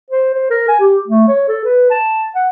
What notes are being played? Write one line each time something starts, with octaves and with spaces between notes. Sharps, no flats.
C5
C5
A#4
G#5
G4
A3
C#5
A4
B4
A5
F#5